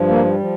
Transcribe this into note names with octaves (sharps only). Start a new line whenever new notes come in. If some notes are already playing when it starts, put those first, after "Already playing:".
Already playing: G2 F3
A#3
G3
F3